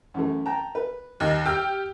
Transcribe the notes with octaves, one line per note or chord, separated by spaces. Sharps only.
F#2 E3 A3
G5 A5 A#5
B4
D#2 D#4
G4 G5 E6 F6